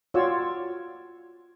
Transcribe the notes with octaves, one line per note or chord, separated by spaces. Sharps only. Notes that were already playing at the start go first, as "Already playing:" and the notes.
F4 F#4 C#5 D5 E6